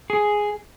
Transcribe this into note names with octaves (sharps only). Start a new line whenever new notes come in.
G#4